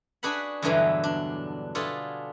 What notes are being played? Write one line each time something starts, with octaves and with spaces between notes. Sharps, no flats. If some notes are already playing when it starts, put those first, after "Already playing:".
D4 F#4 G#4 B4 F#5 B5
E2 G2 B2 D3 E3 F#3
D4
B3 D4 F4 G#4 A4